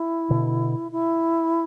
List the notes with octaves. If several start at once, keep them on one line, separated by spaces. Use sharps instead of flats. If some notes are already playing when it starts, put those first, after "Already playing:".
Already playing: E4
B2 D3
E4